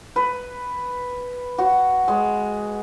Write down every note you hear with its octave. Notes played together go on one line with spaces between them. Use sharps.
B4
F#4
G#3